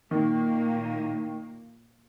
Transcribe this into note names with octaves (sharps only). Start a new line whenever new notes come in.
A#2 D#3 A#3